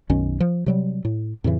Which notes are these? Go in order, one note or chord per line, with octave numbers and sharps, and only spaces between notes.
B1 F#2 D#3 C#4
F3
C3 F#3 G3
A2
F2 A2 C#3 E3